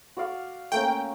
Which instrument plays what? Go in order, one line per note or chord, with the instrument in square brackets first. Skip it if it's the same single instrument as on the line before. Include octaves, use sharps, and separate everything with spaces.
[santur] F#4 D5 F5
[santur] A3 A#3 C#4 [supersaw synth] G5